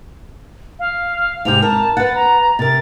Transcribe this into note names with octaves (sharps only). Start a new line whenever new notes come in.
F5
G#2 C3 G4 F7
A#4 A5
B4 F#5 A6
A#5
C3 A#4 A6